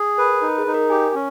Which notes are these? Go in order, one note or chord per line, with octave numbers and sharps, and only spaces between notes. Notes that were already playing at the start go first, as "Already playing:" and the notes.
Already playing: G#4
A#4 B4
D#4 A#4
G#4
D#4
A#4
G4 G#5
C#4